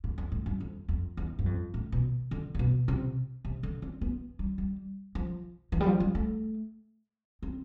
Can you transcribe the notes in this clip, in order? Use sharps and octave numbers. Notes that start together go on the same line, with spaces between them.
A2
F2
A2
G2
F2
F2
E2
G2
F2
A2
B2
D3
C3
B2
C3
C3
D3
C4
B3
G3
G3
F3
E3
G3
F3
G3
A3
C4